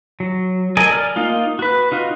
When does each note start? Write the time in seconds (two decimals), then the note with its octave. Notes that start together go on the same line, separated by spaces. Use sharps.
0.20 F#3
0.77 A4 A#4 D#5 G#5
0.91 D5 F6
1.16 A#3 D#4 F4
1.59 F#4 B4
1.92 D#4 F4 F#4